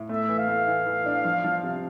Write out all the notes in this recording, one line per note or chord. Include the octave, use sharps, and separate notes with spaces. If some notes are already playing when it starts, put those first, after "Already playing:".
Already playing: A2
A3 E5
E3
F5
A3
E3
E3
D4
F3
F3
C3